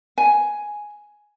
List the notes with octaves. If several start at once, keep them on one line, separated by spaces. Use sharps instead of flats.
G#5